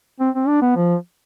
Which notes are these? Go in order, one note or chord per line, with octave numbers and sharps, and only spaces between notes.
C4
C4
D4
B3
F3